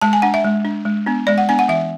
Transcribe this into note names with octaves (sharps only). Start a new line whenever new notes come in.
G#3 A5
G#5
D4 F#5
E5
G#3
D4
G#3
B3 D4
G#3 D5
F#5
B3 D4 G#5
F#5
E3 E5